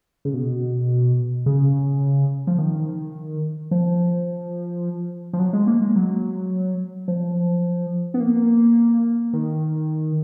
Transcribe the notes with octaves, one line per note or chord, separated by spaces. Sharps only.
C#3
B2
C#3
F3
D#3
F3
F3
F#3
G#3
A#3
G#3
F#3
F3
B3
A#3
D#3